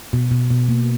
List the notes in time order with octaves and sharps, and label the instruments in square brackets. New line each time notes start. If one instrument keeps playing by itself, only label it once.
[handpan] B2
B2
B2
A#3